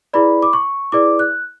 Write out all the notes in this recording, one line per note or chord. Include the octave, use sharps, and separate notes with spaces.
E4 G#4 B4 D5 B5
D6
C#6
E4 G#4 B4 D5 D6
F#6